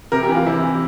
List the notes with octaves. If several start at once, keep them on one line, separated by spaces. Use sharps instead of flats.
C3 A#4
G4
E3
F4
C3 E4
E3